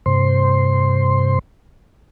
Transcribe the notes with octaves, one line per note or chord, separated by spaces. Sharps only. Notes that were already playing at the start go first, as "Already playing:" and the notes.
G2 C3 C5 C6